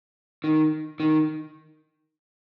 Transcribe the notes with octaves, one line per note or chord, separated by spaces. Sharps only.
D#3
D#3